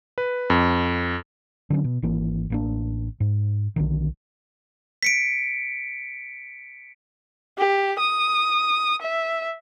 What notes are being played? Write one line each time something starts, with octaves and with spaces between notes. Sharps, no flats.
B4
F2
D3 F#3 C#4
B2
G#1 E3 A#3
A1 A#3 D4
G#2
B1 D3 D#3
B6 C#7 D7
G4
D#6
E5